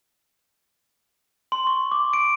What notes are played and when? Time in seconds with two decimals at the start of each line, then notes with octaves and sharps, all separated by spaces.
1.52 C6
1.67 C#6
1.92 D6
2.13 D7